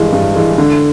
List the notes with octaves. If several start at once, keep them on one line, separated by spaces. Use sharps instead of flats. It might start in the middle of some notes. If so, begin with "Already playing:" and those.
Already playing: G2 E3 G#3
G2
E3 G#3
D3